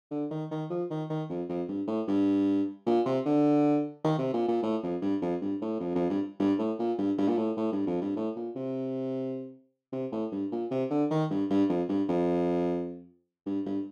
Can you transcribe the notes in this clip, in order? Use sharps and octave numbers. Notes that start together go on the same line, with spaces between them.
D3
D#3
D#3
F3
D#3
D#3
F2
F2
G2
A2
G2
A#2
C3
D3
D#3
C3
A#2
A#2
A2
F2
G2
F2
G2
A2
F2
F2
G2
G2
A2
A#2
G2
G2
A#2
A2
A2
G2
F2
G2
A2
A#2
C3
C3
A2
G2
A#2
C3
D3
D#3
G2
G2
F2
G2
F2
G2
G2